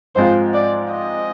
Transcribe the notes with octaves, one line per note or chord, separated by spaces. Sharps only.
G#2 F3 G#3 C4 F4 C5
D5
D#5